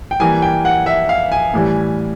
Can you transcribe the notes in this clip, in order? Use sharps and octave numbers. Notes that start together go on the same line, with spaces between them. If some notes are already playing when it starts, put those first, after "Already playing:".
G5
E3 G3 A#3 G#5
G5
F#5
E5
F5
G#5
A2 E3 G3